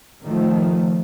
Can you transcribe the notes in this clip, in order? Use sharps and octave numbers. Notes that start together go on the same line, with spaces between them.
D#3 F3 A3